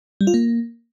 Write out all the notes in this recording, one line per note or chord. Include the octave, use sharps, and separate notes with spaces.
G3
F4
A#3